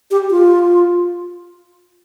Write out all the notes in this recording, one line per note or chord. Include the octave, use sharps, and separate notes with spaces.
G4
F4